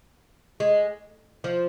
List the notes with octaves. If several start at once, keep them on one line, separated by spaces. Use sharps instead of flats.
G#3
F3